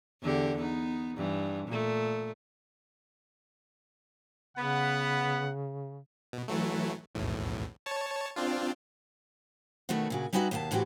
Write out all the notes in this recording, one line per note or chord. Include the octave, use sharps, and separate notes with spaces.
E2 D3 G4
B3 D#4
G2 E3
A#2 A3
C#3 B3 F#5
B2
E3 F#3 A3
B1 E2 A2
C#5 A5
C4 D4 F4
B2 D#3 A3 C#4 E4 F#4
A#2 C#3 F#4
G3 C#4 D#4 F#4 B4 E5
D#2 B2 F5 G#5 A5
A2 E3 C4 F#4 G4